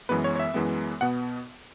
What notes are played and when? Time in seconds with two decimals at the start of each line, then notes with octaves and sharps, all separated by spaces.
0.09 F#2 E3 G#3 B3 B4
0.24 C#5
0.35 C#5
0.40 E5
0.54 F#2 E3 G#3 B3
1.01 B2 B3 F#5